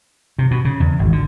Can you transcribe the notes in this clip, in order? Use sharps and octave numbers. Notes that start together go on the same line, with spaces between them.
C3
B2
C#3
E2
G#1
D3